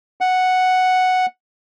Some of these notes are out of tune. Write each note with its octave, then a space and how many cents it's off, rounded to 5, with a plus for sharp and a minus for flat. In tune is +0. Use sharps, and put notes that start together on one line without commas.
F#5 +0